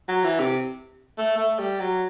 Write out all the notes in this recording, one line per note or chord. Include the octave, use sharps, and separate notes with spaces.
F#3
E3
C3
A3
A3
G3
F#3